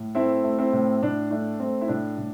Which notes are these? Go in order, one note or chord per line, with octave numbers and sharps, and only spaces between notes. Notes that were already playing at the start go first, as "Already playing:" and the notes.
Already playing: A2
A3 C4 E4
A3
C4 E4
A2
A2 D4
A3 D4
A3 C4
E4
A2 D4
A2